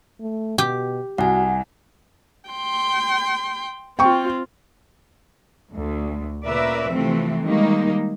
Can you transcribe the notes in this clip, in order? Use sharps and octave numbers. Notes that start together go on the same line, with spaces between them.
A3
B2 G4
C2 F#4 F#5 G#5
G5 C6
C4 F4 G5 C#6
D2
A#2 C#3 A#4 B4 D5 E5
C3 E3 F3 A3 C4
D#3 G3 G#3 A#3 D#4